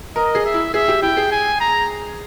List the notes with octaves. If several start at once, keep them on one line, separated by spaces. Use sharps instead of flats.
A#4 D#5
G#4
E5
E4
G#4 E5
G4
E4 G5
G#4
G#5
A#5